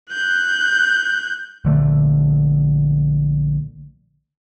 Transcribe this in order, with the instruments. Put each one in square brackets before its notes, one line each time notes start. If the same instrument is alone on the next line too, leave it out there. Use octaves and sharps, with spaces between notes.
[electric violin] F#6 G6
[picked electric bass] A#1 D3 A3